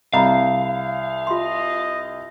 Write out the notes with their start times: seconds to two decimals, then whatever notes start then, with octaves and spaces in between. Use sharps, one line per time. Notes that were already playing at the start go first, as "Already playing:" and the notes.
0.13 C2 D#5 F5 A#5 B5
1.27 F4 D#5 C6